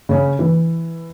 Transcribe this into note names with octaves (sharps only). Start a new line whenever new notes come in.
C#3 C#4
E3